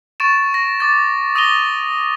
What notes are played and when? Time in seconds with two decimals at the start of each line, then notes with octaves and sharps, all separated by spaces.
0.20 C#6 A6 D7 E7
0.54 A#6
0.80 D6 A6
1.35 D#6 A#6 D#7 F7 G7